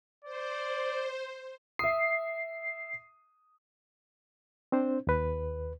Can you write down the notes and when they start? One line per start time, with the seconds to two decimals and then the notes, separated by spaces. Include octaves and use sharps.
0.25 C5 D5
1.79 E5 D#6 C7
4.72 C4 D4 C5
5.07 D#2 B4